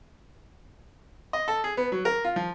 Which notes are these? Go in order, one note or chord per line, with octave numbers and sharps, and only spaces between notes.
D#5
A4
G#4
B3
F#3
A#4
F4
F3